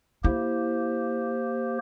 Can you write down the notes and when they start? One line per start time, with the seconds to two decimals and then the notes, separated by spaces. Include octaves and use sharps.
0.24 A#3 E4 G4 C5